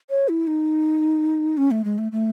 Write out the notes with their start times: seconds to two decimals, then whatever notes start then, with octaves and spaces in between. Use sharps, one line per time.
0.10 C#5
0.29 E4
0.47 D#4
1.57 C#4
1.71 A3
1.84 G#3
1.98 A3
2.12 A3